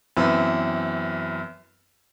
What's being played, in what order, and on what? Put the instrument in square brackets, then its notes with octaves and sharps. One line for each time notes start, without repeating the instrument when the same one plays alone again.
[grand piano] F#2 E3 B3 C4 B4 E5